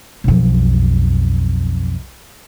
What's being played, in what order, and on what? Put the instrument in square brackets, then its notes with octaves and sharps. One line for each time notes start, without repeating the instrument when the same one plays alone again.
[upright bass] B1 F2